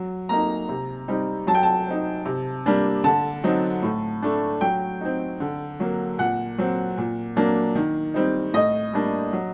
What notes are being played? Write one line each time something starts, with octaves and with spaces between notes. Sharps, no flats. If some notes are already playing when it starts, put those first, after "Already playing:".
Already playing: F#3
A#3 D#4 A#5
C3
G3 C4 D#4
F#3 A5
G5
A5
C4 D#4
C3
G3 A#3 D4
D3 A5
F#3 C4 D#4
A2
A3 D4
F#3 G5
C4 D#4
D3
F#3 A#3
A#2 F#5
F#3 C4
A#2
F#3 A#3 D4
D#3
G3 C4 D#4
A2 D#5
G3 A#3 D4
F#3